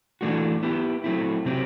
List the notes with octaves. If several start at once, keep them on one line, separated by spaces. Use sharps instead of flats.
E3 A3 D4 F#4
B3 E4 G4
F#3 A3 C4 E4
C3 F#3 C4 G4